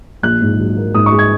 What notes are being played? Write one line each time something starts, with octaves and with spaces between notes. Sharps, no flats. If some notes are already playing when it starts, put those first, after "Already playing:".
A#1 F#6
G#2
F#3
A#3
G#2 D#6
C#6
G#3
G#6